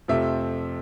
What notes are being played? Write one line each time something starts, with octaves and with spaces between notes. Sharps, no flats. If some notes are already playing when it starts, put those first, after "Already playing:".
F2 C3 F3 A3 C4 E5